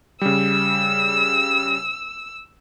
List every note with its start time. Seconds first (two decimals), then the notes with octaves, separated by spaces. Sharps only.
0.21 C#3 G3 E6